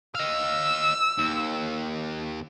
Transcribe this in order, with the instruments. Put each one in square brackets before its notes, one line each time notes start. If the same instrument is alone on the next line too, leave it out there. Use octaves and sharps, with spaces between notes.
[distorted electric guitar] D#5 F5 [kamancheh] E6
[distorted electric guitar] D#2